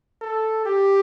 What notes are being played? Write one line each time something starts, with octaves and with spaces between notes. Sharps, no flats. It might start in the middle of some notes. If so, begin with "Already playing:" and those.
A4
G4